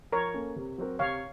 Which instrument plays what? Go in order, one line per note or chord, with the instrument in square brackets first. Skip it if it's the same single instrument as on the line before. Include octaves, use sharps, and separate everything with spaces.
[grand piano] F3 [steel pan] A#4 C#5
[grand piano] A#3 C#4 A4
C3
F#3 C4 F#4 A#4
[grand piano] C3 [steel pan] C#5 F5